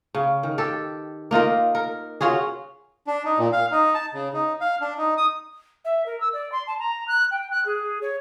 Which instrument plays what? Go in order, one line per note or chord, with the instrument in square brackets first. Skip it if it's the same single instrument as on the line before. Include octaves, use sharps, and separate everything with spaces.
[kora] C#3
D#3
G4 A4
A#3 D#4 F4 A#4
A#4
C#4 F4 F#4 G#4
[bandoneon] D4
D#4
A#2
F5
D#4
A5
C#3
D#4
F5
D4
D#4
D#6
[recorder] E5
A#4
E6
D5
C6
A5
A#5
F#6
G5
F#6
G#4
C#5